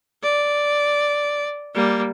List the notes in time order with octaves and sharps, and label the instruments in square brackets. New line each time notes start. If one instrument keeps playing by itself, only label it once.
[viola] D5
G3 A#3